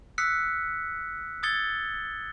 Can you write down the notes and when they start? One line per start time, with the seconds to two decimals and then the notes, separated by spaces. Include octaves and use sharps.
0.18 D#6 E6 F#6 B6 C#7
1.43 D#6 E6 G#6 A6 C#7 G7